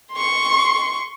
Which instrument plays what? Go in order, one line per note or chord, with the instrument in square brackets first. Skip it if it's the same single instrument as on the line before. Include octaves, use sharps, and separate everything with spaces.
[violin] C6 C#6